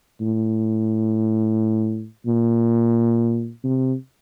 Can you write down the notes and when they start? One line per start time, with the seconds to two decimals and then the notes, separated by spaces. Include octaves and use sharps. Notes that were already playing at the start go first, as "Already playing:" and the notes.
0.21 A2
2.27 A#2
3.64 C3